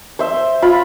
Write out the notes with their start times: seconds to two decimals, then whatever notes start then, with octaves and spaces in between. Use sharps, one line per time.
0.19 C5 E5
0.62 F4 B5